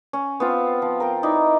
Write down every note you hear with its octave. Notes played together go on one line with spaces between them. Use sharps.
C#4
B3 C4 F4
F3
A#4 G5
D#4 E4 D5 D#5